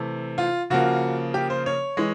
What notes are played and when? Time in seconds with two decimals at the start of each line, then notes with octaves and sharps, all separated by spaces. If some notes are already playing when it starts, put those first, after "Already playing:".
Already playing: C3 E3 A3
0.38 F4
0.70 C#3 F3 A#3 F#4
1.34 G4
1.50 C5
1.66 C#5
1.97 E3 G#3